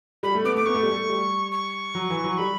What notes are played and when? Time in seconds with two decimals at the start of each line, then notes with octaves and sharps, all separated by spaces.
0.23 G3 B5
0.35 A3
0.44 B3 D6
0.55 A3 D6
0.66 B3 C#6
0.75 A3
0.83 G3
0.92 A3
1.10 G3
1.52 C#6
1.95 F#3
2.10 E3
2.24 F#3
2.38 G3 B5